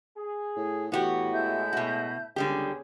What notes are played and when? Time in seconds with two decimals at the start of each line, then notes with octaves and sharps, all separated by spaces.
0.17 G#4
0.56 A2
0.92 A2 E3 B3 F#4 G4
1.32 G#3 E4 E5 A5 G6
1.73 B2 F#4
2.36 C#2 D3 G3 B3 C#4 G4 G#4